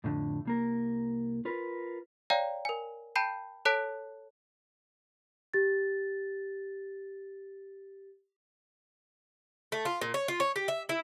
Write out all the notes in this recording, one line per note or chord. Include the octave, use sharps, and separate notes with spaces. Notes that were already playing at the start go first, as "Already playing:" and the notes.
F2 A2 D3
C2 A#3 A#4
F4 A#4 B4
C#5 D5 F5 G5 A#5
A#4 G#5
G5 A5 B5 G6 C7 D#7
A4 C#5 A5 F#6 B6 D7
G4 A6
A3
F4
A#2
C#5
F4
C#5
G4
E5
E4